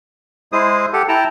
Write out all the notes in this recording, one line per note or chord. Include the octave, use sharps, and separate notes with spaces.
G#3 E4 G#4 C5 D#6
G4 A4 F#5
E4 G5 A5 A#5